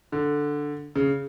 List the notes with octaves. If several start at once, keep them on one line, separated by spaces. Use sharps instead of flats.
D3
C#3